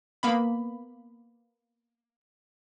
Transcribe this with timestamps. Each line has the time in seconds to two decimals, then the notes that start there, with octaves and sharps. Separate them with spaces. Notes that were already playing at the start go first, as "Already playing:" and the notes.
0.23 A#3 B3 B5